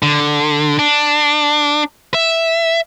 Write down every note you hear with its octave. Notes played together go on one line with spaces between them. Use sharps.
D3
D4
E5